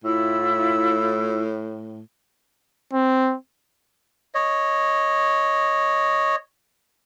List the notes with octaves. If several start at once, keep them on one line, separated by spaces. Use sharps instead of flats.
A2 E4 F4 E6
C4
C#5 D#5